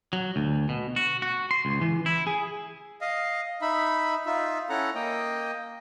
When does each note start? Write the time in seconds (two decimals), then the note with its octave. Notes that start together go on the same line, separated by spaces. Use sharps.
0.13 F#3
0.36 D2
0.69 B2
0.96 F#4
1.22 F#4
1.51 C6
1.65 C#2
1.81 E3
2.06 E4
2.27 G#4
3.01 D#5 F5
3.62 D#4 E5 B5
4.26 D#4 F4 E5
4.69 C#4 E4 A4 F#5 A#5
4.95 A#3 D#5 G5